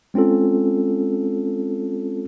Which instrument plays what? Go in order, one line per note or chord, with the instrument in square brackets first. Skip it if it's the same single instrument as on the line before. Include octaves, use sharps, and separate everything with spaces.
[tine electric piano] G#3 C4 C#4 F4 A4